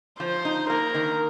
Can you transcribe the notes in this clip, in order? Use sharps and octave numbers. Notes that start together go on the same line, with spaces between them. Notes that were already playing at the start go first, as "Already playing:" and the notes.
F3 C5
D#4
A#3 A#4
D#3